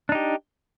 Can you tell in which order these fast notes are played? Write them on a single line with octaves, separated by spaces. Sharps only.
D4 D#4 G4